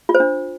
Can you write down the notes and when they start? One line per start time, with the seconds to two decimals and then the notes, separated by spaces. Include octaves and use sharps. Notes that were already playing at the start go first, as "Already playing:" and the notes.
0.09 F4
0.15 C5
0.20 D4